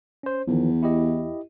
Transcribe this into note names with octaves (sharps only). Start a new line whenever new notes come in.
C#4 C5
E2 D#3 F3
E4 G4 D#5